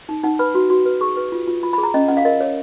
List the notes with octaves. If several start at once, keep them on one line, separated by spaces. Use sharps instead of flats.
D#4
D#4 F#5
B4 B5
F#4
F#4
B4
G#4 C#6
B4
F4
F4
F4 B5
G#4 B5
A#5
C#4 D#5
C#4 F#5
F5
A#4 D#5
C#5